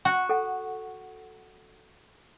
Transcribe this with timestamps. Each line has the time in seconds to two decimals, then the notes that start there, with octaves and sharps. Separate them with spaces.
0.05 F#4 F#5
0.29 A4 F#5